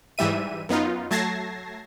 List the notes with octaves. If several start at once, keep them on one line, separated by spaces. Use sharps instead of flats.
G#2 E3 G3 E5 D#7
F#2 B3 D#4 F4
F#3 A3 A5 G#6 A#6 C7